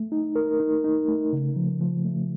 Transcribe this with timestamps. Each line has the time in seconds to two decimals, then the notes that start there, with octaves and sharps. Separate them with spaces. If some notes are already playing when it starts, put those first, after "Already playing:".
Already playing: A3
0.12 D#4
0.36 A#4
0.60 D#4
0.84 D#4
1.08 A3
1.33 C#3
1.56 F3
1.81 F3
2.05 A3